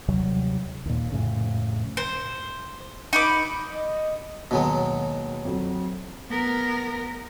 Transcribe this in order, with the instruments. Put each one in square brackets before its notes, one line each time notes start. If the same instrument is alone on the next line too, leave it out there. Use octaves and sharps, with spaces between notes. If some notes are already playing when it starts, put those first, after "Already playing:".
[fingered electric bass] D#2 C3 F#3 G3
D#2 A#2
F2 A2 C#3
[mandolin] C5
D#4 B5 D6
[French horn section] D#5
[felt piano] D#2 [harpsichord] B2 F#3 G#3
[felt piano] F2 F#3
[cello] B3 A#4